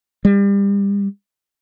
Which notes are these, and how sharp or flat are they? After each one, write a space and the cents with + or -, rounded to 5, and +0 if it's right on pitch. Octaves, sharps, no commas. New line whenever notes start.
G3 +30